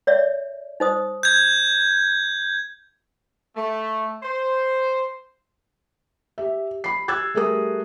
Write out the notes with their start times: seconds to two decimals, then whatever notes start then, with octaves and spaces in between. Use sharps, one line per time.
0.07 C#5 D5 E5
0.80 D#4 C5 D#6
1.23 G6 G#6
3.56 A3
4.22 C5
6.38 G4 E5
6.84 B5 C7
7.08 E6 F#6 G#6 A6
7.34 G3 A3 G#4 A#4 D#6